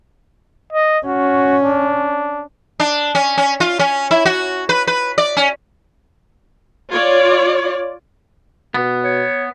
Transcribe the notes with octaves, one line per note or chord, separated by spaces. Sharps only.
D#5
C#4 F#4
D4
D4
C#4
C#4
F4
C#4
E4
F#4
B4
B4
D5
C#4
F4 C#5 D5
B2 B3
C#5